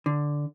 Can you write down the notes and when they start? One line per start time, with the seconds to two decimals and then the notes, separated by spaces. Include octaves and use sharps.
0.06 D3